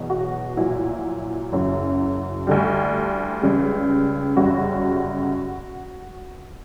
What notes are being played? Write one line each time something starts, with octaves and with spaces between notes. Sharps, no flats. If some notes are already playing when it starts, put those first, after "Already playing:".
Already playing: E2 B2 F#3
F#4
A#1 A#2 F#3 E4
F#1 F#2 C#3 F#3
D2 D3 G3
C#2 C#3 G3
G1 F#2 C#3 G3 F#4